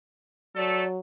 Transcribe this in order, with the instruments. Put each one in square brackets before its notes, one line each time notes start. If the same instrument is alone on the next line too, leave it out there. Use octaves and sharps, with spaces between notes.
[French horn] F#3 [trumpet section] A3 A4 [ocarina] D5